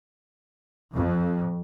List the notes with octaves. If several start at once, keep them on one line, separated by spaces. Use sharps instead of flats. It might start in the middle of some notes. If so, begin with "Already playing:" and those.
F2